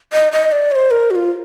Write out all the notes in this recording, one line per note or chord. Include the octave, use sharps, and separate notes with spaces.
D#5
D#5
D5
C#5
C5
A#4
F#4
F4